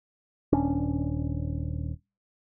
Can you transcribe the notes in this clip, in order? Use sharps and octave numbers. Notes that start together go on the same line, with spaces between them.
D#1 C#4 D4